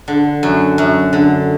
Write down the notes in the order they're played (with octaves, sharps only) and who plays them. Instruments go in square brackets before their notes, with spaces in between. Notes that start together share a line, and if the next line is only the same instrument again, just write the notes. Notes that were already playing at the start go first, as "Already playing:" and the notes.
[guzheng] D3
F#2
F#2
D3